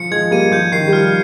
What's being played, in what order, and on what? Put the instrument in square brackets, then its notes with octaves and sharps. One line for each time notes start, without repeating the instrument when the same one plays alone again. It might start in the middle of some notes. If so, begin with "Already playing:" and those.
Already playing: [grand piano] F3 [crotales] C#7
[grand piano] F3 G#3 [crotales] G#6
[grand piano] G3 A#3 [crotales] D#7
[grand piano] F3 [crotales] G6
[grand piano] D#3 [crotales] C7
[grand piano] G3
[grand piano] F3 [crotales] F6